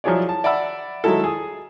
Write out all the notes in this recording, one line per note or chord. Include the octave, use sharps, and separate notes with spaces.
F3 F#3 E4 G#4 C#5 D5
A5
D5 E5 F#5 B5 E6
D#3 F#3 G#3 E4 A4
G#4 D#6